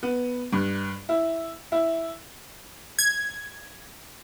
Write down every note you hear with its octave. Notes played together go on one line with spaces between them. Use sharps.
B3
G2
E4
E4
G#6